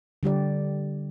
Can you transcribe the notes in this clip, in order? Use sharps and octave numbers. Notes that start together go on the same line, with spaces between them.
D3 G3 G4 D5